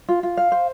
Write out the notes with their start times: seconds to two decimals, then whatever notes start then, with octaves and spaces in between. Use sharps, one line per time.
0.09 F4
0.23 F4
0.37 F5
0.52 C5